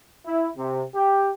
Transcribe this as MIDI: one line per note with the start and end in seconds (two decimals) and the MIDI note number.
0.25 0.48 64
0.56 0.83 48
0.95 1.30 67